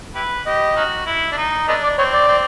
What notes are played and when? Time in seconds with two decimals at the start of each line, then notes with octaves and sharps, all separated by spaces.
0.15 E4 G4 B4
0.46 G4 D#5
0.76 C#4 D#4 F#4
1.07 E4
1.32 D4
1.38 D#4
1.68 A3 B3 D4 D#5
1.83 D5
1.98 C4 C#5
2.13 D5
2.28 C4